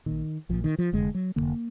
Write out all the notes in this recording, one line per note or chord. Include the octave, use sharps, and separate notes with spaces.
A#1 A#2 D#3
A#1 A#2 F3
D#3
F3
F1 F2 D3 G#3
F#3
F1 F2 D3 A#3